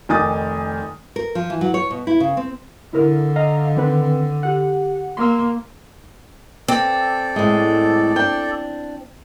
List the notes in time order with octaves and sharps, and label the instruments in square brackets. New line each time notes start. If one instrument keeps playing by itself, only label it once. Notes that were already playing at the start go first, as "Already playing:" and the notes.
[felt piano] F1 D#3 G#5 D6 D#6 A6
[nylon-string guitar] A#4
F3
E3
F#3
C#5
B2
E4
C#3
C4
[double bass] D3 [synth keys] E4 A#4
[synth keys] D#5 F5 A#5
D#3 C4 B4
G4 F#5
[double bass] A#3 [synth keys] C6 E6
[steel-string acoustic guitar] C4 [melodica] A4 D5
[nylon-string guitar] A2 G#3
D4 G5